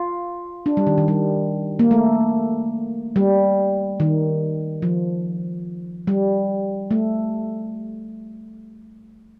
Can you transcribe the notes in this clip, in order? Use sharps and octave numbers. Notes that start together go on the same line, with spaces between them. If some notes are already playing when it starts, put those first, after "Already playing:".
Already playing: F4
D4
G3
D#3
D#3
G3
A#3
A3
G3
D#3
F3
G3
A3